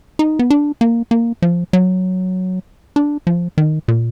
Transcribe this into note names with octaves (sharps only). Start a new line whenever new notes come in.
D#4
B3
D4
A#3
A#3
F3
F#3
D4
F3
D#3
A#2